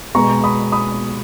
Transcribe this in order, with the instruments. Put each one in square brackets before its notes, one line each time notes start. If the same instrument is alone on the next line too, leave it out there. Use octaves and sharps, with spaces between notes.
[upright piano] B2 G#3 B3 A#5 C#6
B5 D#6
B5 D#6